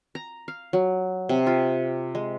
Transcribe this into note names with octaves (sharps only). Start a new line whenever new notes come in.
A#5
F5
F#3
C3
F4
G#3